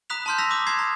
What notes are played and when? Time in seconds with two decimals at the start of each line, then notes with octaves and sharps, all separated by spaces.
0.10 A#5 B5 D#6 F#6 B6 F7
0.26 A5 A#5 C6 F6 G6
0.38 E6 A#6 B6 F7
0.51 B5 D6 D#6 F#6
0.67 A#5 C6 D#6 G#6 C7
0.79 A#5